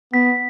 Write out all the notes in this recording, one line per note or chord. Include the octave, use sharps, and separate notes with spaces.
B3 B6